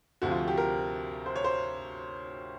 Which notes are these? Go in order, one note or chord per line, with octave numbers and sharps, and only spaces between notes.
D2 C3 F3 F#4
F4
G4
A#4
C5
C#5
C5